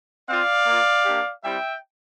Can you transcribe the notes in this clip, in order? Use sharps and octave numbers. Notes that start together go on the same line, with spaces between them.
C4 F4 D5 F5
A#3
F4
A#3 D4 G4
G3 C4 E4 G4 E5 G5